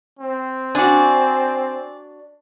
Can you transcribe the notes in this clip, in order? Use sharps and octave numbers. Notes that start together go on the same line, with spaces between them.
C4
D4 F#4 D5 G#5